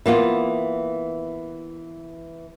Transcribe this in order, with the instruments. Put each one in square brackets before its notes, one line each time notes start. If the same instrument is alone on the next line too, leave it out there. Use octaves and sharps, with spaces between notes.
[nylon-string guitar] E3 A#3 B3 F4